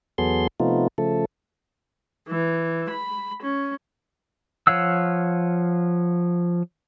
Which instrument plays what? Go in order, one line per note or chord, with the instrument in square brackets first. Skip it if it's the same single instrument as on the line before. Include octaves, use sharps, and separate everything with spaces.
[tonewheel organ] E2 F#3 B3 G#4 A4 C6
C3 F3 A3 B3 D#4 F4
C#3 F3 A3 A4
[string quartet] E3
B5
C#4
[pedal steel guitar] F3 C#5 F5 F#5 E6